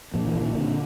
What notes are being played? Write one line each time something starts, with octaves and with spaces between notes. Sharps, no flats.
A#2 F3
E3
A#2
D#3
A#2 D3